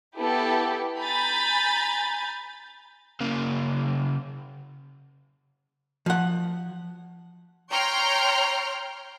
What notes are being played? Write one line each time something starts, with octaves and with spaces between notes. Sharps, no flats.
B3 E4 G4 A4
G#5 A#5 B5 G6 A6
C#3 A#3
F3 F#5
C#5 G5 A#5 C6 F6